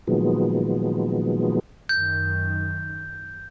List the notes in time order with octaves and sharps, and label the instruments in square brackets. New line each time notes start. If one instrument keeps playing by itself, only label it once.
[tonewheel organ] A#2 D#3 F3 F#3 G#3 B3
[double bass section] F#2 D#3 [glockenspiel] G6